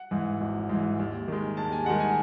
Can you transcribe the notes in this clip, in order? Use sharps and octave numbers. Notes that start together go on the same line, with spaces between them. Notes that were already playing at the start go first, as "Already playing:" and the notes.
Already playing: F#5
G#2 E3
G#1
G#2 E3
D#2
D#3 G#3
D#2 A5
G#5
D#3 G#3 F#5
G#5